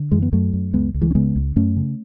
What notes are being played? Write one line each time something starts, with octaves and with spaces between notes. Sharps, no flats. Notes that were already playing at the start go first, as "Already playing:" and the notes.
Already playing: D3
F#2 E3 G#3
B3
F#2 F#3 A3
F#2
C#2 G#3 B3
C#2
E3 G#3
C#4
C#3 G#3 B3
C#2
F#2 A3 C#4
C#3